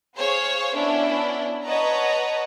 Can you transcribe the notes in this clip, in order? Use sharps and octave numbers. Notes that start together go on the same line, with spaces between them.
G#4 C5 C#5 F5
B3 C#4 D4 E4
B4 C#5 D#5 F#5 A5 A#5